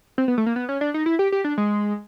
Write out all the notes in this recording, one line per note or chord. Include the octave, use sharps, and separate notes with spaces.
C4
B3
A3
A#3
B3
C#4
D4
D#4
E4
G4
G4
D4
G#3